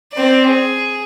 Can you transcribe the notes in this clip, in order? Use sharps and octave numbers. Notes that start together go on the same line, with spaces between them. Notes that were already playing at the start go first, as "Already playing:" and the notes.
C4 D5
G#4